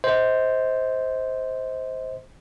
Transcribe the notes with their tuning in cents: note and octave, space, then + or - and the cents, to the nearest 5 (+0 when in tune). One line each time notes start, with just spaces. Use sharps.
C5 +0 D#5 +35